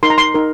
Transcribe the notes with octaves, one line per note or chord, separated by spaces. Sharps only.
D#4 A#4 C6
A#5
C6
D#4 A#4